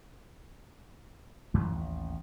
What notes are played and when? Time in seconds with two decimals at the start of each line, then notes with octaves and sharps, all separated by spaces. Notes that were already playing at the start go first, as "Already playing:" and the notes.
1.54 A1 F#2 E3
1.74 A1 D#2